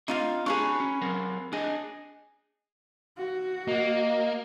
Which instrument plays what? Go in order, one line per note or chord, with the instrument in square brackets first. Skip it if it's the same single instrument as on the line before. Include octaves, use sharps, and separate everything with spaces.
[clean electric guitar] C4 D4 [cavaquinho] D#4 F4 F5
[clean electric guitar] D4 F#4 A#5 [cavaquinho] G#4 B4 C#5
[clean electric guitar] C#4
F#3 C4 A#4
[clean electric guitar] D4 D#5 [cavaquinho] G#4
[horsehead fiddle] F#4
[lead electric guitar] A#3 [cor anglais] D#5